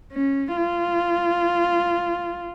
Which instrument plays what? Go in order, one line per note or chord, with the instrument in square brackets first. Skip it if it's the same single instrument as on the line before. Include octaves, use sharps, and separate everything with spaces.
[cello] C#4
F4